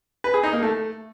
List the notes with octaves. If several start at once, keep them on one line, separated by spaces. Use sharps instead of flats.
B4
G#4
D#4
A#3
A3